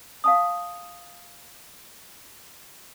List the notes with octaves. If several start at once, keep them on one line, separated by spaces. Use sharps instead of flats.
F5 A5 D#6